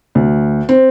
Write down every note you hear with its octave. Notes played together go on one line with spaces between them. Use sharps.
D2
C4